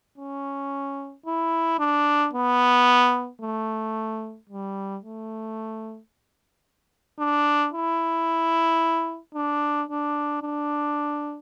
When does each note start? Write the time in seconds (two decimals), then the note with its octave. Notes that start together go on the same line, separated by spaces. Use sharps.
0.18 C#4
1.26 E4
1.79 D4
2.33 B3
3.41 A3
4.49 G3
5.03 A3
7.19 D4
7.73 E4
9.35 D4
9.89 D4
10.42 D4